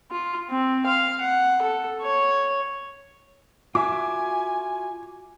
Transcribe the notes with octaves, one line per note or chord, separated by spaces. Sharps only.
F4
C4
F5
F#5
A4
C#5
F4 F#4 E5 G#5 D6